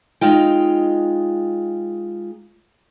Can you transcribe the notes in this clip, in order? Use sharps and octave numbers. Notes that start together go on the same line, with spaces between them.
G#3 D#4 F4 G5